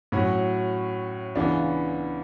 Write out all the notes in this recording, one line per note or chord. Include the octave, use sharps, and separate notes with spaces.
A2 F#3 C#4 F#4
C#2 C#3 E3 B3 D4